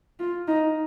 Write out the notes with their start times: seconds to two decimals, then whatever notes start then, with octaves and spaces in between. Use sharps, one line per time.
0.20 F4
0.48 D#4